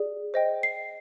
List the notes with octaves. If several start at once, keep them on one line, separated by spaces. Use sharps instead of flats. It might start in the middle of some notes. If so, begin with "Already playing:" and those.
Already playing: G#4 D5
C5 D#5 G5
C7